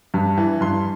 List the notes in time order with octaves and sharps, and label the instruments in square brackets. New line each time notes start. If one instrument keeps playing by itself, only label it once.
[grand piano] G2
E3
G2 C6